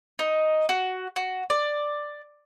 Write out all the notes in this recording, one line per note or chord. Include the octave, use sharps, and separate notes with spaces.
D#4
F#4
F#4
D5